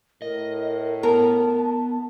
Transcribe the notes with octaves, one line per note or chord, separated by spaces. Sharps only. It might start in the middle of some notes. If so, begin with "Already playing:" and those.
A2 A#4 D#5
B3 A#4 A5